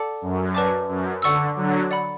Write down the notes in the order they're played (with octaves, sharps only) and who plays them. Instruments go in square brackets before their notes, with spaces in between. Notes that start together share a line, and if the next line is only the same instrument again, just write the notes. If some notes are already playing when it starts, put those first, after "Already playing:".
Already playing: [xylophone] A4 D5 F#5 A5 D6
[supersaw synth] F#2
[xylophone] B4 D5 A5 D6
[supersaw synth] F#2
[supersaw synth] D3 [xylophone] D5 F#5 C#6 E6
[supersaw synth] D3 F#3
[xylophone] D5 F#5 B5